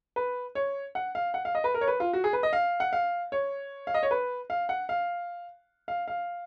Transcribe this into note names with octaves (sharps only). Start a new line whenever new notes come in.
B4
C#5
F#5
F5
F#5
F5
D#5
B4
A#4
C#5
B4
F4
F#4
G#4
B4
D#5
F5
F#5
F5
C#5
F5
D#5
C#5
B4
F5
F#5
F5
F5
F5